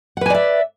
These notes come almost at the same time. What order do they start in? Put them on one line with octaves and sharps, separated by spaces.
F#5 B4 G#5 D5 E5